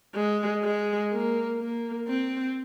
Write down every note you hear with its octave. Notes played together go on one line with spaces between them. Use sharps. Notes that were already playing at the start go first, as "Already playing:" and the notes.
G#3
G#3
A#3
A#3
C4